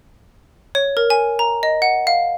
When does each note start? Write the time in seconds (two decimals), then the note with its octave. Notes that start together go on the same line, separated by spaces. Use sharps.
0.75 C#5
0.97 A#4
1.10 G#5
1.39 A#5
1.63 D#5
1.82 F#5
2.07 F5